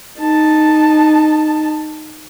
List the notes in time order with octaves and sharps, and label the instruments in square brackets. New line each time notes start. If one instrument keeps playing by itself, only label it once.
[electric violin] D#4 A5